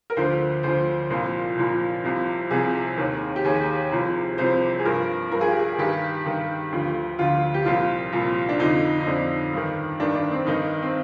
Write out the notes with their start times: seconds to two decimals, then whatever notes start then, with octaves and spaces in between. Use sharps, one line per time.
0.10 A#4
0.17 D2 D3 F3 C5
0.63 D2 D3 F3 C5
1.10 C2 A#2 F3
1.57 C2 A#2 F3
2.04 C2 C3 F3
2.51 C2 C3 F3 G#4
2.97 D#2 D#3
3.36 G4
3.44 D#2 D#3 G#4
3.92 C2 C3 F3
4.38 C2 C3 F3 C5
4.79 G#4
4.85 G2 F3 A#4
5.31 G2 F3 A#4
5.41 G#4
5.50 G4
5.59 G#4
5.74 G#4
5.78 G2 D#3 G4
6.26 G2 D#3
6.72 D2 D3 F3
7.19 D2 D3 F3 F4
7.54 G4
7.65 C2 A#2 F3 F4
8.12 C2 A#2 F3
8.49 D4
8.59 F2 D3 F3 D#4
9.00 D#4
9.06 F2 D3 F3 D4
9.53 G2 D#3
10.00 G2 D#3 D4
10.15 D4
10.32 C4
10.47 G2 D#3 D#4
10.82 C4